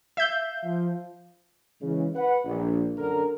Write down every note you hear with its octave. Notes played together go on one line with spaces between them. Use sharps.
E5 F5 G6
F3
C#3 E3 G#3
B4 F#5
A#1
F#2 D3 A4 A#4